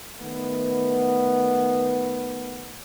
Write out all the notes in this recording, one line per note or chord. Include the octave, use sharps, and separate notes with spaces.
D#3 A3 B3